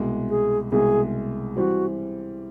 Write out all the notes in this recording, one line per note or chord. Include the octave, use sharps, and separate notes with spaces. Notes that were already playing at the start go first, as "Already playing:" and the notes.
Already playing: C2 B2 G#3
G#4
C2 B2 G#3 G#4
E3 G3 C4 F#4